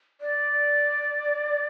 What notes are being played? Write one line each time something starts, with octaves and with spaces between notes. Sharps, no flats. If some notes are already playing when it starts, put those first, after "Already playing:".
D5